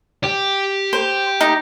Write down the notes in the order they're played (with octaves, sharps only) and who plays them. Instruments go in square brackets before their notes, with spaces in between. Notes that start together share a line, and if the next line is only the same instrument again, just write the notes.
[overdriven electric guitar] G4
[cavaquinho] C5
D#4